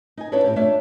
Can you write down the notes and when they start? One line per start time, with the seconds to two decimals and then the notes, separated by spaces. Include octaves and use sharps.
0.17 D#4 G#5
0.32 C#4 D4 E4 A4 B4 C#5
0.44 A2 G4
0.56 A3 D4 F4 C#5 E5 F5